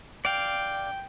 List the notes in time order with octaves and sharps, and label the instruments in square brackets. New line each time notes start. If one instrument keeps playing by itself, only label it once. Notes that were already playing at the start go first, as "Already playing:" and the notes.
[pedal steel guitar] D5 F5 [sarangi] G5